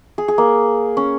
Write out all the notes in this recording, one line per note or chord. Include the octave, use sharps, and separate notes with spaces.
G#4
G#4
A#3
C#4